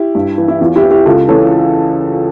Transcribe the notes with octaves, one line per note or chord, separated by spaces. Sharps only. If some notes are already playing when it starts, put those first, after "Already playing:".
Already playing: E4 G4
G2
E3
E4
E2 F4
E4 G4
E3
E4 G4
C#2 F4 A4
C#3 E3 A4 C#5